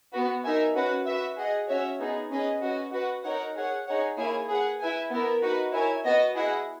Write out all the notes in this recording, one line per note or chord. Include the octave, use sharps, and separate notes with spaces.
B3 F#4 B4
D#4 A#4 E5 G#5
C#4 F#4 B4 F#5
F#4 B4 E5
G#4 D#5 F#5
C#4 F#4 C#5 E5
B3 D#4 G#4
C#4 G#4 B4 D#5
C#4 F#4 B4 D#5
F#4 B4 F#5
D#4 A#4 C#5 F#5
G#4 C#5 F#5
D#4 G#4 C#5 F#5
A#3 E4 G#4 C#5 G#5
G#4 B4 F#5
E4 B4 E5 G#5
B3 E4 A#4
D#4 F#4 B4
E4 A#4 C#5 G#5
B3 F#4 B4 D#5
E4 G#4 D#5 F#5